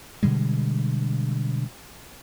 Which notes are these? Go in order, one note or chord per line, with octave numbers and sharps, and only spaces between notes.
B2 D3 G3 G#3